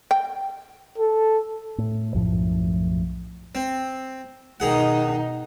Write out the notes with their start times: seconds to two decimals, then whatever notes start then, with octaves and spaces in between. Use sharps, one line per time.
0.11 G5
0.98 A4
1.78 A2
2.14 B1 F#2 A2 F3
3.55 C4
4.60 B2 D#3 D#4 G#4 F#5